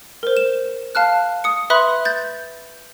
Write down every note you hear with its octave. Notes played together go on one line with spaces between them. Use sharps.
A#4 C5
E7
F5 A5 F6 F#6
D#6 C#7
B4 E5 B5 C6 D#6 F#6
G6 A6